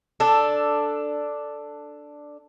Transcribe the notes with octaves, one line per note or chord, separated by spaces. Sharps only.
D4 A4